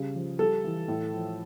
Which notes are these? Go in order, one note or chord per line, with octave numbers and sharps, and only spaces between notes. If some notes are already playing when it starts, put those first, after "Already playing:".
Already playing: C#3 G3
F3
G3 A4
E3
A2
F3